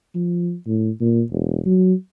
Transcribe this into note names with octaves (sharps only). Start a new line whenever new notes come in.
F3
A2
A#2
E1
F#3